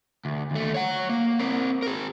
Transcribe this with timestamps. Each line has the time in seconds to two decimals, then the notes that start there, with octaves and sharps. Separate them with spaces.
0.25 D2
0.51 D#2 A3
0.74 C#5 F#5
1.09 A#3
1.39 C4 A#4
1.82 G#4 A#4